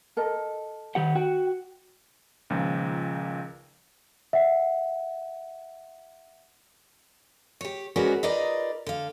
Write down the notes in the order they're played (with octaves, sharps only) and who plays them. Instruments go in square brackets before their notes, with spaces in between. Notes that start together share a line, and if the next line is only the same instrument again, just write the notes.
[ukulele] A4 A#4 D#5
[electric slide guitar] D#3 G4 F#5
[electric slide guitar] F#4 [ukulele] G5
[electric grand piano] C#2 A#2 D#3 F3
[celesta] E5 F#5
[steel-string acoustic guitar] G4 C#5
G#3 C#4 F#4 A#4 B4 D5
D#4 F4 A#4 B4 D5 D#5
D3 F5